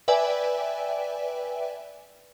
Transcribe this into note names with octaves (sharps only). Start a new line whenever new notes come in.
B4 D5 E5 G5 G#5